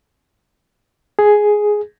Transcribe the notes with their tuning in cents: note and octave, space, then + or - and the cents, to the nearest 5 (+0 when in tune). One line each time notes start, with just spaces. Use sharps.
G#4 +5